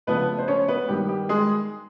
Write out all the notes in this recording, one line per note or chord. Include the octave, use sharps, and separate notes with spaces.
C#3 F3 A3 B3 D4 B4
C5
C#4 C#5
B3 B4
G2 D#3 G3 B3 G4
G4
G#3 G#4